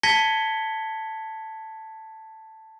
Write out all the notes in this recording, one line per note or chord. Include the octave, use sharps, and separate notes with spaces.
A5 G#6 A#6 B6 C#7 G7